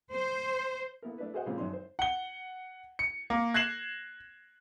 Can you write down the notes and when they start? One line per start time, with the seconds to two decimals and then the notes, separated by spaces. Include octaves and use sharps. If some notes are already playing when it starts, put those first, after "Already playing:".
0.13 C5
1.02 A#3 B3 E4 A4 A#4
1.18 A3 D4 B4
1.33 F#4 G#4 A#4 C5 D#5 F#5
1.46 A#2 C#3 F3 G#3 C4 F4
1.58 F#2 D#3 D4 D#4 C6
1.73 C5
1.99 F#5 G7
2.99 C#7
3.30 A#3
3.54 F#6 G#6 A#6 C7 E7 F#7